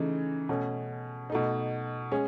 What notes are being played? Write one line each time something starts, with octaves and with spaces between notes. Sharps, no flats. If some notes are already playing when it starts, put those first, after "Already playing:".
Already playing: C#3 E3 A3 D#4
B2 A3 C#4
B2 A3 D#4
G#3 C#4 G#4